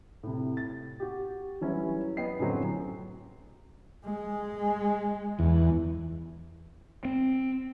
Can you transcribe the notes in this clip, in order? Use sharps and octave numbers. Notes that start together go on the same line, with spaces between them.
A2 C3
A6
F#4 G4
E3 F#3 G3 C#4 E4
B3 D#5 G5 C7
F#2 A2 D3 F#3 C4
G#3
E2
C4